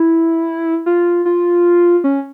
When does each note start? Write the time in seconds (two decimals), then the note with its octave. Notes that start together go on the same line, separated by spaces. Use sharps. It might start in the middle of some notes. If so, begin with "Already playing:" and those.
Already playing: E4
0.86 F4
1.25 F4
2.04 C#4